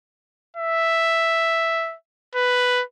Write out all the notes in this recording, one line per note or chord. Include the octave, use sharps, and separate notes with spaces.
E5
B4